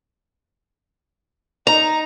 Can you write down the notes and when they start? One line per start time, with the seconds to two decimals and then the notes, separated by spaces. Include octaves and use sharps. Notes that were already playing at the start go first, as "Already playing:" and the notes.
1.67 D#4 A#5